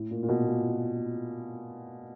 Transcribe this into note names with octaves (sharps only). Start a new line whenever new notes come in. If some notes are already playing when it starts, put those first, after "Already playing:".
Already playing: A2
A#2
A#2
B2
A#2